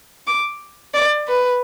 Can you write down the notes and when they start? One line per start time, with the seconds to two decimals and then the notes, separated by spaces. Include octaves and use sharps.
0.27 D6
0.94 D5
1.28 B4